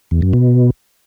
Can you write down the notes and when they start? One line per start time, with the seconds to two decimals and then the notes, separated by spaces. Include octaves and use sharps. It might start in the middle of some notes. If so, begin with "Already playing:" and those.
0.11 E2
0.22 F#2
0.33 B2